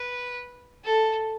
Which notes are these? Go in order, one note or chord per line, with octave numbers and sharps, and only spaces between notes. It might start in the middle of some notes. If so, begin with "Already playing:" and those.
Already playing: B4
A4